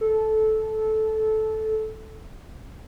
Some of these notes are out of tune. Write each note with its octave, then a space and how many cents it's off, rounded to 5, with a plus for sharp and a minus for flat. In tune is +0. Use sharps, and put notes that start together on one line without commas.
A4 -15